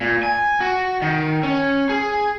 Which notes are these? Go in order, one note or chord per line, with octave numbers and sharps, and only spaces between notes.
A#2
G#5
F#4
D#3
C#4
G#4